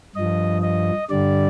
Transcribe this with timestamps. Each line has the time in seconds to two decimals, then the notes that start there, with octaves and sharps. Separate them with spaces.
0.16 G2 F3 D#5
0.62 D#5
1.10 G2 D3 G3 D5